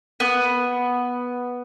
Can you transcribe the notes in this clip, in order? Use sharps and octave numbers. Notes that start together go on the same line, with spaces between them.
B3